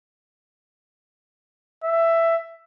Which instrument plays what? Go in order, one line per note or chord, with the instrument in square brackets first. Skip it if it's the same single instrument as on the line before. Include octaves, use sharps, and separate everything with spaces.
[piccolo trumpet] E5